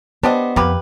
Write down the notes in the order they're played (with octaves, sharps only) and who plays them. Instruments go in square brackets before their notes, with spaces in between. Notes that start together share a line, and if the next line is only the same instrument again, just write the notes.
[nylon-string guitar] B3 C5 [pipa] D4 G4 D#5
[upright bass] F2 [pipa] A#3 G4 B4